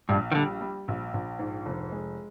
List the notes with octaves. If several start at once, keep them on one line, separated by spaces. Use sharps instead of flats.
A#1 G2
D#3
D3 G3
G3
A#1
A#1
G#2
F1
G#3